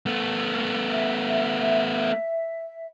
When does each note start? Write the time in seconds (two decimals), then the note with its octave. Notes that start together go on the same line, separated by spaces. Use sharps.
0.06 A3 B3
0.88 E5